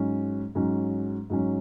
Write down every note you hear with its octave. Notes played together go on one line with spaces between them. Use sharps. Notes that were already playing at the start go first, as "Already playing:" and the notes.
Already playing: G#2 F#3 C#4
G#2 F#3 C#4
G#2 F#3 C#4